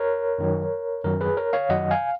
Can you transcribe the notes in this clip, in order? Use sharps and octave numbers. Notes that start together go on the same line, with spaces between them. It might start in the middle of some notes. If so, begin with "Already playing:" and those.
Already playing: A#4 C#5
F#2 D#3 F#3
F#2 D#3 F#3 A#4
G#4 B4
A#4 C#5
C#5 F5
F#2 D#3 F#3 D#5 F#5
F5 G#5